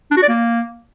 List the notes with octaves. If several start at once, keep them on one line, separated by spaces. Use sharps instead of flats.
D4
F#4
D5
A#3